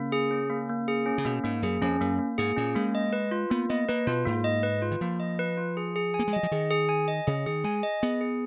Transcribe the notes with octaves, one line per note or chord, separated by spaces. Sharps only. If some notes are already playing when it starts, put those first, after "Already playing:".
Already playing: C#3 A#3
G#4
C#4
A#3
A#3
G#4
C#4
C#3
B2 A#3
G#2 A#3
F#2 G#4
F2 C#4
F#2 A#3
A#3
G#2 G#4
A#2 C#4
G#3 A#3
D#5
B4
F4
A#3 B3
B3 D#5
A#3 B4
B2 F4
G#2 A#3
D#5
B4
F4
D#3
F3 A#3
D#5
B4
F4
G#4
G#4
G#5
A#3
G#3
F#3 D#5
F3
D#3 G#4
G#4
G#5
D#5
C#3 G#4
D#3 G#4
G#3 G#5
D#5
B3 G#4
G#4